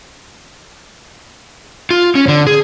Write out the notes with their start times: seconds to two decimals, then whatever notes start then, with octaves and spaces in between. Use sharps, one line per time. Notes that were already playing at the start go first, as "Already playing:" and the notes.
1.91 F4
2.15 C#4
2.28 D3
2.47 G#4